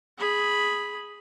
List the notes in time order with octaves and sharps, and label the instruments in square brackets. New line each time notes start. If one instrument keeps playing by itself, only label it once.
[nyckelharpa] G#4 B5